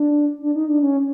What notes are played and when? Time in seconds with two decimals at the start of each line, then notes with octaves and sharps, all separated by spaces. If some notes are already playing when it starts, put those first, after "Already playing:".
Already playing: D4
0.42 D4
0.55 D#4
0.69 D4
0.82 C#4